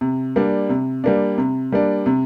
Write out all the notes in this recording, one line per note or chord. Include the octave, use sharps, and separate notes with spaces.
C3
G3 A#3 D4
C3
G3 A#3 D4
C3
G3 A#3 D4
C3